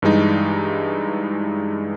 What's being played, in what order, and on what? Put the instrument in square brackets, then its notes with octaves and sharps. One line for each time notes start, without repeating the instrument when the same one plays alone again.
[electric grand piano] G2 E3 G3 G#3 D#4